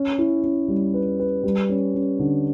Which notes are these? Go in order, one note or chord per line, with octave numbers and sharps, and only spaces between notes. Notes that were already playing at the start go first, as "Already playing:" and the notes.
Already playing: C#4
E4
C#4
G3
B4
B4
G3
C#4
C#4
D3